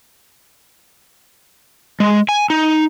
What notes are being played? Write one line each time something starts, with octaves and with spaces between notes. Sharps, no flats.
G#3
G#5
D#4